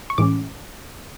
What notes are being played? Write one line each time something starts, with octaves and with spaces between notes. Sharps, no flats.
C#6
A2 E3 G#3 C#4 D6